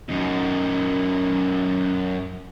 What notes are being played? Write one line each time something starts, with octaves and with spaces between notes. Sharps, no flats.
F#2 D#4